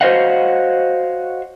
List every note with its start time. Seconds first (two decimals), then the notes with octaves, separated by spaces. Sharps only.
0.01 F#4 C5 C#5 D#5 F5 F#5